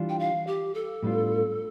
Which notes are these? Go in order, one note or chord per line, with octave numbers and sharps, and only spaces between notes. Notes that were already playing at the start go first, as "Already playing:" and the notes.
Already playing: E3 G3 D4 F4
G5
F5
G4
A4
A2 G3 B3 D4 F4